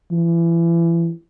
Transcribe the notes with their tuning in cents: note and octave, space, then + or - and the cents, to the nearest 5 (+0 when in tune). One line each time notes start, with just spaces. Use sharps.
E3 +30